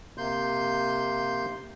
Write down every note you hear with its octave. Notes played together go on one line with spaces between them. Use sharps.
C3 A#3 C6 G6